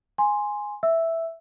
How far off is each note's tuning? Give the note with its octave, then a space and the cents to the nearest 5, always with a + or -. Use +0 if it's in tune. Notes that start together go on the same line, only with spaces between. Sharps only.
G#5 +0 C6 +0
E5 +0 E6 +0